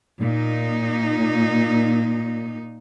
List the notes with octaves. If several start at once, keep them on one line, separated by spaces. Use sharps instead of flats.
A#2 D#4